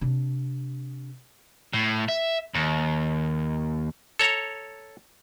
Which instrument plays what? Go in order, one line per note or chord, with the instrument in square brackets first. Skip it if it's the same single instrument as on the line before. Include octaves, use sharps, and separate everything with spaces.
[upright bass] C3 D4
[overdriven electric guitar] A2
E5
D#2
[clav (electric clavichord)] A4 C#5 A#5